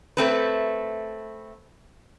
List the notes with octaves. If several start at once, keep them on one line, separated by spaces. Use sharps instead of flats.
A3 C4 B4